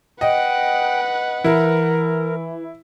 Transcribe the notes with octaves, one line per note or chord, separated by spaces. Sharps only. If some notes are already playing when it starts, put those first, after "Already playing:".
B4 D#5 F#5 G5
E3 E4 A#4